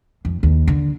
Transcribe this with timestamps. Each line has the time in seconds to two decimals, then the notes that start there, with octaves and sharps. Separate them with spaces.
0.25 F2
0.43 D#2
0.67 D3